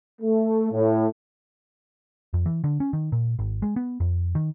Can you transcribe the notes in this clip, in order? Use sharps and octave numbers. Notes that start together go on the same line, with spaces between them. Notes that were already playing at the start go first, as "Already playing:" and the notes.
A3
A2
F2
E3
D3
C#4
D#3
A#2
G#1
G#3
B3
F2
D#3